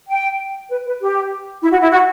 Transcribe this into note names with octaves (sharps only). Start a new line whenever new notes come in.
G5
B4
B4
G4
E4
F#4
E4
F#4